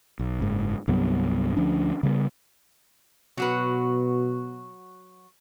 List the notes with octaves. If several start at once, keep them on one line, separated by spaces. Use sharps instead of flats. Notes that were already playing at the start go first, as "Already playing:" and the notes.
B1
F#1 G#2
C2 G2 F#3 B3
D2 F3 C#4 D4
C#3 G3 A3 B3
B2 F#3 F#4 B4